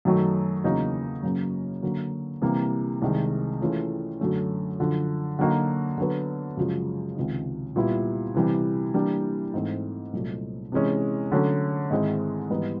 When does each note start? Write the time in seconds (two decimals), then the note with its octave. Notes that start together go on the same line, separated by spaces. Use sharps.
0.05 F#2 D#3 F#3 A3
0.64 E2 C#3 F#3 A#3 D#4
1.23 F#2 C#3 F#3 A#3
1.82 D3 F#3 A#3
2.42 C3 E3 G3 A#3
3.02 C2 C3 D#3 G#3
3.61 E3 A3 C#4 F4 G#4
4.20 F#2 D3 F#3 A3 C#4
4.80 F#2 D3 F3
5.39 D3 F#3 A#3 D#4 F#4
5.98 D3 F#3 B3
6.57 F#2 C#3 F3 G#3
7.16 C#2 C3 D#3
7.76 A#2 G3 B3 E4
8.35 C3 E3 G3
8.94 E3 G3 A#3 D4
9.54 G#2 E3 A3 C4
10.13 C2 A#2 F#3 A3
10.72 C3 E3 G#3 C#4
11.32 D3 F#3 A3 C#4
11.90 G#2 D#3 G#3 C4 E4
12.50 G#2 E3 G3 B3 D#4